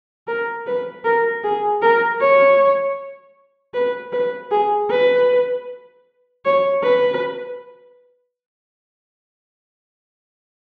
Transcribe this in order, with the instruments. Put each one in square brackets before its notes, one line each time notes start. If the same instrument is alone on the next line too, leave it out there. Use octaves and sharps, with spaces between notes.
[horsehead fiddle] A#4
B4
A#4
G#4
A#4
C#5
B4
B4
G#4
B4
C#5
B4